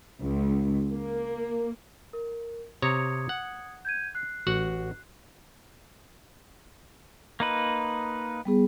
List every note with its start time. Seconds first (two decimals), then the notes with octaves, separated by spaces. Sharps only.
0.21 C#2
0.93 A#3
2.13 A#4
2.82 C3 C#5 A#5 D#6 G#6 C#7
3.29 F#5
3.85 G6 G#6 D#7
4.15 F#6 C7
4.47 A1 F#4 F#5
7.40 A#3 D#4 B4
8.45 G3 B3 G#4